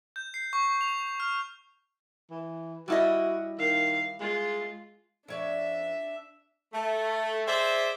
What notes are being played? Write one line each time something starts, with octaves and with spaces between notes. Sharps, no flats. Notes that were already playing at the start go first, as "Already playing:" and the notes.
G6
C7
C#6
F7
F6
E3
G3 E4 F#4 D#5
D#3 F5
G#3 F4
F2 D4 C#5 D5 E5
A3
G#4 C5 D5 E5